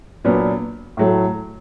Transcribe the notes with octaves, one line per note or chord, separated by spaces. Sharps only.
A#2 F#3 B3 D4
A2 F#3 A3